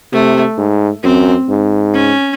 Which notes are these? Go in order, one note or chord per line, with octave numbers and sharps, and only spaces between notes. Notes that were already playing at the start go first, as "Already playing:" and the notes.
C3 A3
G#2
F#2 C4
G#2
C#4